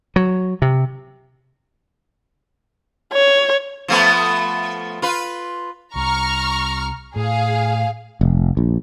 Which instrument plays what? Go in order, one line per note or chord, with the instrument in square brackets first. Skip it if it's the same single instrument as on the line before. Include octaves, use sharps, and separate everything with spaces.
[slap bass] F#3
C3
[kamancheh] C#5
[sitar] F3 A3 B3
F4 B4
[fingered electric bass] C2 [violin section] A#5 C#6 F6
[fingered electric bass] A2 [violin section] G#4 F5
[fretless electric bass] F1
A#1